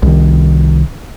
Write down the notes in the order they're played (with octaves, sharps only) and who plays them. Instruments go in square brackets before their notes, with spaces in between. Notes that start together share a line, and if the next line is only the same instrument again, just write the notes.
[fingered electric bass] C2 D#3